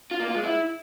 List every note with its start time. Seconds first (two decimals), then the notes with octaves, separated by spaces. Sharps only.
0.11 F4
0.19 A#3
0.28 F4
0.36 G#3
0.44 E4